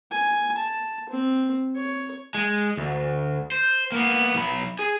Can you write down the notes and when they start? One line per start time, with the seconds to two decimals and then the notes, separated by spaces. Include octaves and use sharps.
0.11 G#5
0.57 A5
1.09 C4
1.76 C#5
2.35 G#3
2.77 D2
3.52 C5
3.92 A#3 B3
4.35 B1 B5
4.79 G#4